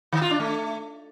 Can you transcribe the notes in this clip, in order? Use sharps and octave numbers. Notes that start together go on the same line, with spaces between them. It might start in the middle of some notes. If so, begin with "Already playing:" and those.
D#3
F4
D4
A3